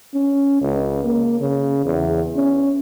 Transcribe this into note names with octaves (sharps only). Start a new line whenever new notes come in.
C#4
C#2
A#3
C#3
E2
C#4